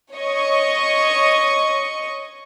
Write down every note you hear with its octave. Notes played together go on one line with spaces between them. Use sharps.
C#5 D#5 C#6